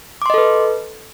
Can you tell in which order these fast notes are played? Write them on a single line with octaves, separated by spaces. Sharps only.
D6 C6 D#5 A4 B4